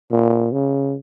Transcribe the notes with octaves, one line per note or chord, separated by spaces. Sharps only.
A#2
C#3